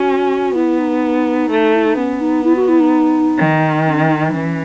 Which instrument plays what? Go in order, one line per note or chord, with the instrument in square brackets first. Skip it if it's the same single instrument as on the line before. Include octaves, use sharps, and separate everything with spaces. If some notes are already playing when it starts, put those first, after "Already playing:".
Already playing: [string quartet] C#4 [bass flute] F#4
[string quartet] B3 [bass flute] E4
[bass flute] D#4
[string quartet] A3
[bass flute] E4
D#4
[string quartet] B3 [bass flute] C#4
[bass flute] D#4
E4
F#4
E4
D#4
[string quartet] D#3
[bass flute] C#4
D#4
[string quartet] E3 [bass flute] C#4